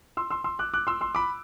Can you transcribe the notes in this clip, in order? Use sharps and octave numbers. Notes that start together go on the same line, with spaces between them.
C6 E6
C6 E6
C6 E6
D6 F#6
D6 F#6
C6 E6
C6 E6
B5 D6